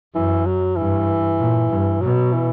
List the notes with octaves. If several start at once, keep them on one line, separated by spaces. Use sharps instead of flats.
F#2 E3
F#3
G2 E3
A#2
G2
B2 F#3
E3